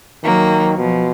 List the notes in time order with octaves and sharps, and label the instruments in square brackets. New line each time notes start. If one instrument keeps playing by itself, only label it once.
[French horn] D#3 [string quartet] F#3 A#3
[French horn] B2 [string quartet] F3